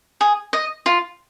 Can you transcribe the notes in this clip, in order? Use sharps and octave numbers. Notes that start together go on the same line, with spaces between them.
G#4
D#5
F4